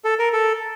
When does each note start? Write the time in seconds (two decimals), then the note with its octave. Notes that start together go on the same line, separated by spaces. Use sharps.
0.05 A4
0.19 A#4
0.33 A4